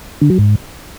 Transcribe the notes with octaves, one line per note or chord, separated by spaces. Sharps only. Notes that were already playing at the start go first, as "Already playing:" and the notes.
D3
F#3
G#2